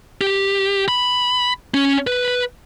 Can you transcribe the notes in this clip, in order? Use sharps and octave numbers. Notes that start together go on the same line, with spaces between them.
G4
B5
C#4
B4